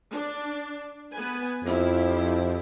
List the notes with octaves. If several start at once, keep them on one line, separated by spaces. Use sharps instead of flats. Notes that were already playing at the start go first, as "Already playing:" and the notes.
D4
B3 B4 G#5
F2 F3 E4 G4